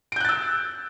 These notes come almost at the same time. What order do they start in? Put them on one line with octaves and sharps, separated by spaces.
D7 G6 F#6 A6 E6